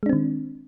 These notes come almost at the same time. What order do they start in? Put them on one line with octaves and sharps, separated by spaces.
G#3 D4 C4 D#3